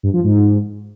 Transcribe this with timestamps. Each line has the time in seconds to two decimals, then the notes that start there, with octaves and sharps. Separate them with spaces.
0.03 G2
0.13 F3
0.24 G#2